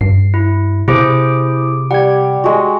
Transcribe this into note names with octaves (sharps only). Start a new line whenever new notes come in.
G2 C7
E4
C3 E4 G#4 C5 D6
G3 F#5 G#6
G#3 F#4